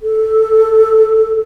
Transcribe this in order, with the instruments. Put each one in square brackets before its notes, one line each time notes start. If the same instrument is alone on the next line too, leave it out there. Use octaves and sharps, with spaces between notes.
[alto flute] A4